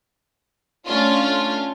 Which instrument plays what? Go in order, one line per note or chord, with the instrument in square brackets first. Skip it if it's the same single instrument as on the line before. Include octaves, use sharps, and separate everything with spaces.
[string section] A3 C#4 D4 F4